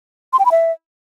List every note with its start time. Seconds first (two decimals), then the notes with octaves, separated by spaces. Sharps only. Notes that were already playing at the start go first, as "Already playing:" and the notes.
0.33 C6
0.39 G5
0.45 B5
0.52 E5